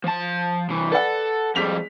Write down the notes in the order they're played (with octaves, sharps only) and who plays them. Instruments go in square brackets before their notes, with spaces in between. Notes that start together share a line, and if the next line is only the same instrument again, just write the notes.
[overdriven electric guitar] F3 A5
C2 E3
[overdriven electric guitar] A4 [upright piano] B4 D5 F#5
[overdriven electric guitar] F2 G3 [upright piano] G#3 B6 F7